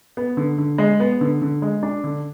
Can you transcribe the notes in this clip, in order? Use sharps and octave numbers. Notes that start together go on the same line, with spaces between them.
B3
D3
D3
G#3
B3
D3
D3
G#3
D4
D3